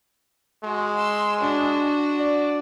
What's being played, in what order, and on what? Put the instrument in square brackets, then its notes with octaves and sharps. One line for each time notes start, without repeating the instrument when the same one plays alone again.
[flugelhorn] G#3 [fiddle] F#4
[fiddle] C6 E6
D4 F#4
[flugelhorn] D5